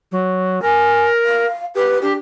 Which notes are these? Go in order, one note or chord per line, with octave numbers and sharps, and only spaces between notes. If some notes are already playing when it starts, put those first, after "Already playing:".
F#3
A#4 G#5
F5
G4 B4
D4 G4